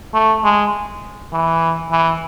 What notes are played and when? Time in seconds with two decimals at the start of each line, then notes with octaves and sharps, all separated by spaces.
0.14 A3
0.44 G#3
1.33 E3
1.91 E3